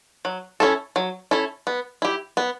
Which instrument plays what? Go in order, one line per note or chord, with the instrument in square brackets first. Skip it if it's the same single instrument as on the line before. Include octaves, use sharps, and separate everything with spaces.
[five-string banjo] F#3
C#4 E4 A4
F#3
C#4 E4 A4
B3
E4 G4
B3